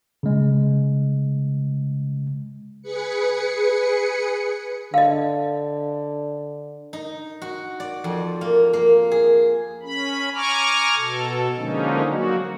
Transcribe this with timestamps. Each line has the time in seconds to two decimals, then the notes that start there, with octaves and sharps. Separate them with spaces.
0.23 C#3 G#3
2.82 G#4 B4 C#7
4.94 D3 D#5 F5
6.93 D#4
7.42 F#4
7.80 D5
8.04 F2
8.41 A#3
8.73 A#3
9.11 G#4
9.83 C#4 B5
10.34 G#5 A#5 C#6 D6 F6
10.95 B2 A4
11.56 D3 F3 G#3 A#3 C#4 D#4
12.06 F#3 A#3 F#4